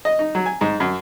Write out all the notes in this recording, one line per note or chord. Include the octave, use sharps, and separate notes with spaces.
D#5
D#4
F#3
G#5
G#2
F#2